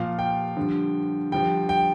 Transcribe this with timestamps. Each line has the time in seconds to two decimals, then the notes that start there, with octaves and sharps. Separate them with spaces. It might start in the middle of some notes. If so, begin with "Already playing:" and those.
Already playing: A#2 F3 F5
0.19 G5
0.57 G2 D3 F3
1.32 G2 D3 F3 G5
1.69 G5